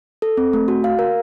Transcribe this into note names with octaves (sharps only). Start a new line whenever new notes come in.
A4
C4
A3
F#4
F5
A#4